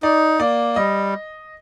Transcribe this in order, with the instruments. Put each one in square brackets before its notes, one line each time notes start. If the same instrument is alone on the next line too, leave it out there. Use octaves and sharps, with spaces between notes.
[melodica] D#4 [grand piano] D5
[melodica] A#3 [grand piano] D5
[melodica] G3 [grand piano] D#5